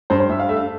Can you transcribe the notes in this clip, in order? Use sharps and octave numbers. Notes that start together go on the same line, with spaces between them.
G2 C5
C5
G2 E5
F5
A3 E5
F5